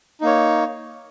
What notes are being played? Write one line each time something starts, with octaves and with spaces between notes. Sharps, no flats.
A#3 D#4 C#5